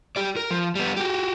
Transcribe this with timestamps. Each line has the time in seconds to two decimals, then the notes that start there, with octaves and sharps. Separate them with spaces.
0.16 G4 D5
0.36 A#4
0.50 F3
0.75 G3 B3
0.96 F#4 G4